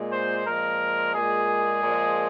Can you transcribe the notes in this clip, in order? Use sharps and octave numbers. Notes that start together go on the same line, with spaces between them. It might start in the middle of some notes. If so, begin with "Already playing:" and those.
Already playing: A#2 G#3
C5
A#2 F3 G#3 A#4
A#2 G#3 G#4
A#2 F3 G#3